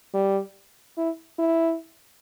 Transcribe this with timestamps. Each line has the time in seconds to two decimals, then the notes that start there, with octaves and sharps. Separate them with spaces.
0.14 G3
0.97 E4
1.39 E4